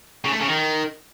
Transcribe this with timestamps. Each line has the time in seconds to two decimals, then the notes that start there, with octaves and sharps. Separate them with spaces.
0.25 C#3
0.32 A3
0.40 C#3
0.48 D#3